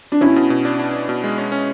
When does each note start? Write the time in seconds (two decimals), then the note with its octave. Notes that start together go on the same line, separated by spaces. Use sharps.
0.12 D4
0.21 B2 C#4 E4
0.36 B2
0.50 B2
0.65 D4
0.79 D4
0.94 D4
1.09 B2
1.24 G#3
1.38 C#4
1.52 C#4